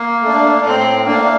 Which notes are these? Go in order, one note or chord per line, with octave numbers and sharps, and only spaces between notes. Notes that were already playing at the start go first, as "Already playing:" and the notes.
Already playing: A#3
A3 D4
A2 C4
A3 A#3 D4